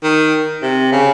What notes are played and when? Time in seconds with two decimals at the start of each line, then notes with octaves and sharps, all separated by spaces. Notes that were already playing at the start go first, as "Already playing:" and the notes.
0.03 D#3
0.62 C3
0.92 C#3